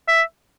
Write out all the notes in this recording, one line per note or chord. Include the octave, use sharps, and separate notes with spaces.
E5